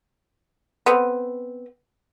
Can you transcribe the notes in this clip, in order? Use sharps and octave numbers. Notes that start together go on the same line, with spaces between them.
B3 C4